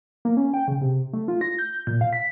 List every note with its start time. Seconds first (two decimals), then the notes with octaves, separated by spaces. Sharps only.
0.25 A#3
0.37 C#4
0.54 G5
0.68 C#3
0.81 C3
1.13 A3
1.28 F4
1.41 A#6
1.59 G6
1.87 A#2
2.01 F5
2.13 B6